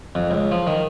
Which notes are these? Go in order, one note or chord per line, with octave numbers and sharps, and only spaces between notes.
F2
C#2
F3
D#3